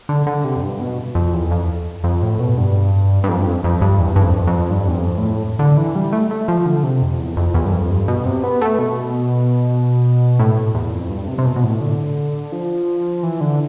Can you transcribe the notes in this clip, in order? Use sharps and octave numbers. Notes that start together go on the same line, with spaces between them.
D3
D3
C3
F2
G2
B2
F2
E2
F2
F2
A2
B2
G2
G2
F2
G2
F2
F2
G2
E2
G2
F2
F2
G2
E2
F2
A2
D3
E3
G3
A3
A3
F3
D3
C3
F2
E2
F2
E2
G2
F2
G2
B2
C3
B3
A3
B2
A2
E2
F2
G2
C3
C3
B2
B2
A2
D3
F3
E3
D3